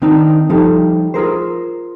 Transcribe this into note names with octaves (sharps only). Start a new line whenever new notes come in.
D#3 C4 D4 D#4
F3 G3 D#4 G4 A4
F4 G#4 A#4 C5